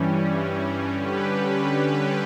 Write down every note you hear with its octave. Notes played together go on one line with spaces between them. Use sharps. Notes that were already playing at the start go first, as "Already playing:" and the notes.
Already playing: G2 E3 G3 C#4
D3 G3 C#4 G4 B4